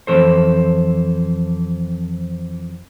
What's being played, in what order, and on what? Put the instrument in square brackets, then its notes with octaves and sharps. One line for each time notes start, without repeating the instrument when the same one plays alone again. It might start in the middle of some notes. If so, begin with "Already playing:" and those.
[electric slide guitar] F2 D#3 E3 A4 C5